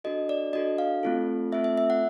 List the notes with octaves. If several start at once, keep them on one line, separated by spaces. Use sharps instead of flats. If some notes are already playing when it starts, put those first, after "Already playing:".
D4 F#4 A4 D#5
D5
D4 F#4 A4 D#5
F5
A3 C4 F4 A4
A3 C4 F4 A4 E5
E5
E5
F#5